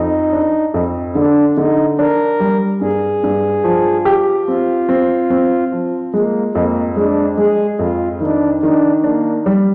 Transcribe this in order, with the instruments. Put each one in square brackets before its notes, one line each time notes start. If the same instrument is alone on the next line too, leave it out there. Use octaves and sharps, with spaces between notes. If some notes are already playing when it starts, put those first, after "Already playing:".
Already playing: [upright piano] F2 [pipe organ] D#4
[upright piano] D4
F2
[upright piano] D3 [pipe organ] D4
[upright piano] D3 [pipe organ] D#4
[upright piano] D4 [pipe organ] A#4
[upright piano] G3
[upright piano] G2 [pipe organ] G#4
[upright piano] G2
F3
G4
[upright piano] C4 [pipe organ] F4
[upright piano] C4
C4
F3
[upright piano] G#3 [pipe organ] A#3
[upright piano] F2 [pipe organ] A#3
[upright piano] G#3 [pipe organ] D4
[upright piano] G#3 [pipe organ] G#4
[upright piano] F2 [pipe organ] F4
[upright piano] D#3 [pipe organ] D4
[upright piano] D#3 [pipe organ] D4
[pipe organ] A#3 [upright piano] D4
[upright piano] G3